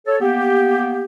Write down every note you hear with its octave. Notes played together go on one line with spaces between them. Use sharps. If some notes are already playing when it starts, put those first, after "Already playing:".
A4 C#5
A#3 B3 G4